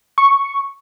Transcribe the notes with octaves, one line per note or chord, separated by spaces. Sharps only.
C#6